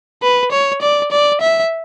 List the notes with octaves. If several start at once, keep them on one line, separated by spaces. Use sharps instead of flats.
B4
C#5
D5
D5
E5